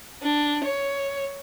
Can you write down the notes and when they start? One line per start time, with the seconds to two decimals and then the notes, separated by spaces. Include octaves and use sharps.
0.22 D4
0.64 C#5